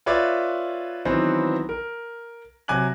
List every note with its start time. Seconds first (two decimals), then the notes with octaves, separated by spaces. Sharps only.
0.06 F4 B4 C#5 D5 E5
1.05 D#3 E3 F#3 B3 C4
1.69 A#4
2.68 C3 F#3 G#5 D6 F#6 F#7